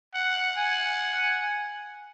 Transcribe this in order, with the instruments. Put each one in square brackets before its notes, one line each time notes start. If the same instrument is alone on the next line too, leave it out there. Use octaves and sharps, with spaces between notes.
[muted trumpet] F#5
[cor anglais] G#5